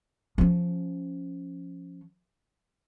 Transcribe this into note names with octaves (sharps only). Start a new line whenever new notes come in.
F3 C#4